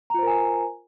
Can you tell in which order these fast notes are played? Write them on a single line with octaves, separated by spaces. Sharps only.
A#5 F4 C5 A#4 G#5